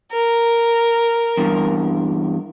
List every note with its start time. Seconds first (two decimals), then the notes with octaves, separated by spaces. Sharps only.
0.12 A#4
1.37 E2 G2